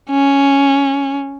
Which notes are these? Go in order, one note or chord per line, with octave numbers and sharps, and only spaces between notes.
C#4